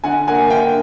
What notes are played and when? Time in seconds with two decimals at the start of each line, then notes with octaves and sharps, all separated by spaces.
0.04 D3 F#5 G#5
0.27 A#3 F#5 G#5
0.50 D3 F5 G5